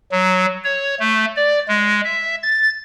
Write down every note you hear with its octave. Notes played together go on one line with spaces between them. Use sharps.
F#3
C#5
A3
D5
G#3
E5
A6